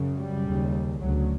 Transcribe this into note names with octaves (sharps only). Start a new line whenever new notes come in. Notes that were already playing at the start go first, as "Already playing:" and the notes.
Already playing: F#2 C#3
G3
D#2 C#3
D2 C#3 F#3